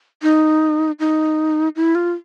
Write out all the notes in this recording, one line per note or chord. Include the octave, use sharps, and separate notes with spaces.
D#4
D#4
E4
F4